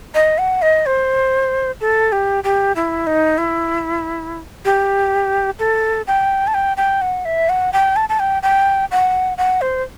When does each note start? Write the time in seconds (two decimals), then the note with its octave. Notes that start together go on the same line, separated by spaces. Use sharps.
0.14 D#5
0.38 F#5
0.62 D#5
0.86 C5
1.81 A4
2.12 G4
2.44 G4
2.76 E4
3.07 D#4
3.38 E4
4.65 G4
5.59 A4
6.07 G5
6.47 A5
6.54 G5
6.77 G5
7.01 F#5
7.25 E5
7.49 F#5
7.73 G5
7.96 A5
8.09 A5
8.19 G5
8.43 G5
8.91 F#5
9.38 F#5
9.61 C5